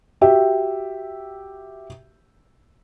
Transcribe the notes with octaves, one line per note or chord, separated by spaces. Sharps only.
F#4 G4 E5 G5